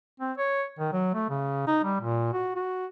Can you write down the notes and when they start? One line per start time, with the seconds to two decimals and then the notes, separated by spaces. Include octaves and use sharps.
0.20 C4
0.38 C#5
0.79 D#3
0.93 F#3
1.14 A3
1.30 C#3
1.67 D#4
1.84 G3
2.01 A#2
2.33 F#4
2.56 F#4